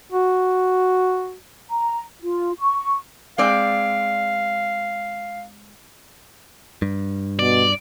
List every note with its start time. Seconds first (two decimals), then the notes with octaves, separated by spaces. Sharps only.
0.12 F#4
1.69 A#5
2.22 F4
2.59 C#6
3.38 G#3 C4 D5 F5
6.82 G2
7.39 B2 D5